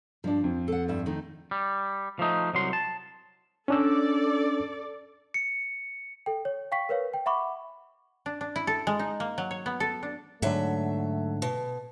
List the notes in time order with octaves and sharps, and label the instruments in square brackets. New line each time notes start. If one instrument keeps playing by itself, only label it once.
[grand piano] G2 D4 [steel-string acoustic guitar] F3
[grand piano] F2
[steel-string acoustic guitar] A4 F#5
G2 G3 E5
D#3 A3 D#4
[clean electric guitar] G3
F3 A3 D#4
C2 F#3 C6
A5
[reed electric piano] C#4 D4 E6 [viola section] A4 D5
[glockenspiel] C#7
[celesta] A4 G5
C#5
F5 G5 C#6 B6
A#4 B4 C#5 F5
G5
E5 F#5 B5 C#6 D6
[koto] D4
D4
E4
A4
G#3
D#4
A#3
F#3
C#5
B3
A4
D4
[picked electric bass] G#2 D3 [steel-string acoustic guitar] F#3 E5 [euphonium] A3
[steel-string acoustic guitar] B2